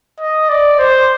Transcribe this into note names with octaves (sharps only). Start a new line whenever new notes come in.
D#5
D5
C5